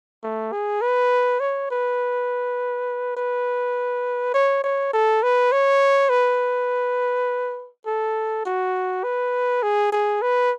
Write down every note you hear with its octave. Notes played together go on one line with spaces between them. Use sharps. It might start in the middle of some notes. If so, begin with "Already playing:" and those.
A3
G#4
B4
C#5
B4
B4
C#5
C#5
A4
B4
C#5
B4
A4
F#4
B4
G#4
G#4
B4